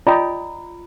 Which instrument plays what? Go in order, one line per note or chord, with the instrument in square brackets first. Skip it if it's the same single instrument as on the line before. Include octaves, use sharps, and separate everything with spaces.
[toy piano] F4 A#5 B5 [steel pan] D5 D#5 G5